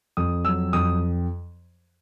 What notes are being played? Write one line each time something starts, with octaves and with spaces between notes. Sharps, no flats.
F2 D#6
F#3 E6
F2 D#6